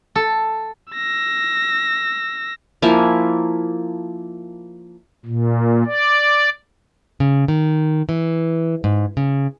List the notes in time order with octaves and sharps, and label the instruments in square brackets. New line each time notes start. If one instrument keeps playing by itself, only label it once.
[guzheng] A4
[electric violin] E6 A#6
[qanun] F3 A#3 E4 G#5
[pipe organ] A#2
D5
[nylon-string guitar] C#3
D#3
E3
G#2
C#3